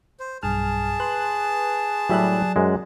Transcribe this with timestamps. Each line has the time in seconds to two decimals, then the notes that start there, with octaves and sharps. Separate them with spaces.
0.20 C5
0.43 B1 G2 G#4 A5 F6
1.00 B4 C6 F#6
2.10 A2 F#3 G3 D5 E5 F#6
2.56 F#2 G#3